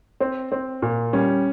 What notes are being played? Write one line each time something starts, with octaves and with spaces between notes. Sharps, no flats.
C4
C4
A#2
G3 C#4